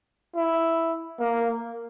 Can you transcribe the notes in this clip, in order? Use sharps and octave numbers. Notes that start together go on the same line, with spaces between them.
E4
A#3